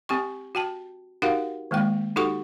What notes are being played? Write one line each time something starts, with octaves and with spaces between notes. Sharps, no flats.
C4 G4 G5 C#6
F#4 G5 A5
D#4 F#4 G4 A#4 F5 F#5
D#3 G#3 A#3 G5
D#4 F#4 G4 A4 F#5 C#6